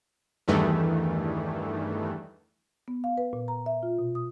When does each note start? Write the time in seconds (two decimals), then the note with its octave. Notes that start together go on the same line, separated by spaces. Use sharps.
0.48 E2 G2 D#3 E3 A3
2.88 B3
3.04 F5
3.18 B4
3.33 A#2
3.48 A#5
3.66 E5
3.83 F4
3.98 B2
4.15 D#6